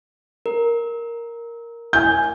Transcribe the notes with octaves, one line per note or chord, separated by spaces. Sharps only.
A#4
G#5 G6